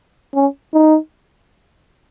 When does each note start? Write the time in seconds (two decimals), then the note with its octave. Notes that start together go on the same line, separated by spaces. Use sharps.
0.35 C#4
0.74 D#4